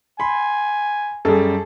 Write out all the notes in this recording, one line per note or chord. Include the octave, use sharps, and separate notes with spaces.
G#5 B5 C6
F#2 G3 G#4 A4